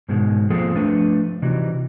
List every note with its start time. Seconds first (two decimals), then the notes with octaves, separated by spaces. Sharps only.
0.09 G#2 B2 D#3 G#3
0.50 F3 A#3 C4 F4 G#4 A4
0.75 F3 A3 D4 B4
1.42 C3 E3 G3 D#4 F#4